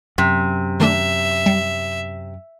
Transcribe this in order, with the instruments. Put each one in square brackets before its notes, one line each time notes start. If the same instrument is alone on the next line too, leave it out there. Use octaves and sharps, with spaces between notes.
[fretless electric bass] F#2 [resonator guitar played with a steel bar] C3
[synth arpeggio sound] D#3 A3 D4 [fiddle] E5
[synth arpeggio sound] G3